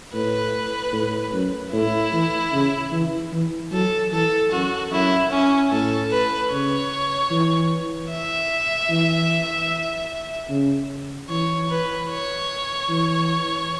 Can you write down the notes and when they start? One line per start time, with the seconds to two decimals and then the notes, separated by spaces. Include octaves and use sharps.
0.14 A2 B4
0.93 A2
1.33 F#2
1.72 A2 E4
2.13 E3
2.53 C#3
2.92 E3
3.32 E3
3.72 F#3 A4
4.12 E3 A4
4.52 F#2 F#4
4.92 F#2 E4
5.31 C#4
5.71 A2 A4
6.11 B4
6.51 C#3 C#5
7.31 E3
8.10 E5
8.90 E3
10.50 C#3
11.29 E3 C#5
11.70 B4
12.10 C#5
12.89 E3